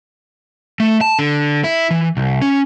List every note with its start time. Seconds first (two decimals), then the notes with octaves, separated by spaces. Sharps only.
0.80 A3
1.01 A5
1.19 D3
1.64 E4
1.91 E3
2.17 C2
2.42 C#4